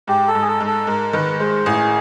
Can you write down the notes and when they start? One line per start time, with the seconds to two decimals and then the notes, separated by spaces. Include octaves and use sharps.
0.08 G#2 G4
0.28 A4
0.35 G#2
0.42 G#4
0.48 A4
0.60 G#2
0.67 A4
0.87 G#2 A#4
1.13 D#3 B4
1.40 G#3 C5
1.66 A1 G#4